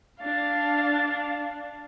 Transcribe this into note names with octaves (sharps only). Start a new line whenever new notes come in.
D4 F5 A6